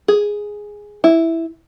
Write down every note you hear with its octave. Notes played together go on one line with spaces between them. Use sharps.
G#4
E4